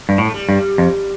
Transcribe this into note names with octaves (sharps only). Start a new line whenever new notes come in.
G2
A2
A3
G3
G2
F2